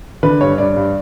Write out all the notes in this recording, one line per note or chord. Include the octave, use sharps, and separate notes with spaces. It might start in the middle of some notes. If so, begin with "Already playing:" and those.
D3 B4
G2 C#5
G2 D5
G2